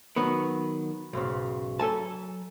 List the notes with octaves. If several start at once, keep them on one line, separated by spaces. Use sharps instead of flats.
D#3 F#3 B3
B1 G#2 C#3
F#3 A4 G#5 A5